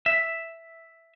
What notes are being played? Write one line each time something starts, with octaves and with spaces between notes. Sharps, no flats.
E5